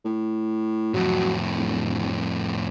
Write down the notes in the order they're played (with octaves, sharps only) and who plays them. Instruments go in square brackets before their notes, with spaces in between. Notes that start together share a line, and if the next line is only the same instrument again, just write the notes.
[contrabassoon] A2
[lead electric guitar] F2 A2 [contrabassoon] F#3
[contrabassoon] D1